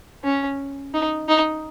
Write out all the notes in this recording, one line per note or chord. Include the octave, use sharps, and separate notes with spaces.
C#4
D#4
D#4